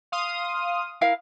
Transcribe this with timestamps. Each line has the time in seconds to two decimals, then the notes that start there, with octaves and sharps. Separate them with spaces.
0.12 F5 C6 D#6
1.01 E4 A#4 F5